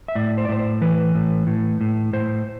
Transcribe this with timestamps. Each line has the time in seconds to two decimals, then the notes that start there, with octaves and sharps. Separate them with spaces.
0.08 E5
0.15 A2 D5
0.38 C5
0.45 D5
0.49 A2 C5
0.59 C5
0.81 E3 B4
1.15 A2
1.47 A2
1.81 A2
2.13 A2 C5